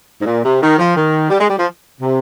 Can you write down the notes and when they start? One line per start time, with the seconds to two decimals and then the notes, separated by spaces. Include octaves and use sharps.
0.21 G#2
0.26 A#2
0.44 C3
0.61 D#3
0.79 F3
0.96 D#3
1.30 G3
1.40 G#3
1.49 G3
1.57 F3
2.00 C3